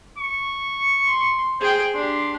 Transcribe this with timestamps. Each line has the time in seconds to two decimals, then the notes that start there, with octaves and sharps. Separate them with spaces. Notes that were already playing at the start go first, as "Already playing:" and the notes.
0.18 C#6
1.06 C6
1.60 G#4 C5 G5
1.95 D4 G4 C6